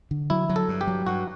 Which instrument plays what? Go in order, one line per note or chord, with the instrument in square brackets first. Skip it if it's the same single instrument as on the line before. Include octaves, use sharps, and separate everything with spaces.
[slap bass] D3
[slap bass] F#3 [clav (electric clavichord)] E4
[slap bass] F#3
[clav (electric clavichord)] A4
[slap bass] G2
[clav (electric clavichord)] G4
[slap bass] F#3
[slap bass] G2 [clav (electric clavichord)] F#4